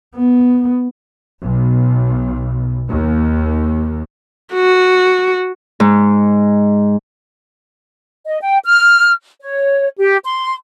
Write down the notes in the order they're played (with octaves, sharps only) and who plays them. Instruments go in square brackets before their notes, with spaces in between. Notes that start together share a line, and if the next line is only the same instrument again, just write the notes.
[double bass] B3
[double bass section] B1
D#2
[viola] F#4
[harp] G#2
[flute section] D#5
G5
F6
C#5
G4
C6